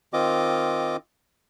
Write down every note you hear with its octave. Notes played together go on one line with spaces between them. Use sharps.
D#3 C4 F4 D#5 D6